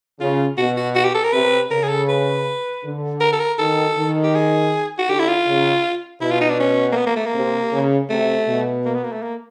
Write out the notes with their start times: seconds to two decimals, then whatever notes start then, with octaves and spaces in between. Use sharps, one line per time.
0.20 C#3 F4
0.57 B2 F#4
0.77 F#4
0.95 F#4
1.04 G4
1.14 A4
1.24 A#4
1.33 C3 B4
1.71 C#3 A#4
1.83 G#4
1.89 A4
2.09 B4
2.84 D3
3.21 A#4
3.33 A4
3.39 A#4
3.59 D#3 A4
3.97 D#3
4.24 G4
4.34 G#4
4.98 F#4
5.08 D3 G4
5.20 E4
5.28 F4
5.46 C#3
6.21 B2 E4
6.31 F4
6.41 D#4
6.50 D4
6.60 C#4
6.92 A#3
6.96 B3
7.07 A#3
7.16 A3
7.26 A#3
7.35 C3
7.72 C#3
8.09 C3 A3
8.48 B2
8.85 A#3
8.95 B3
9.03 A#3
9.12 A3
9.22 A#3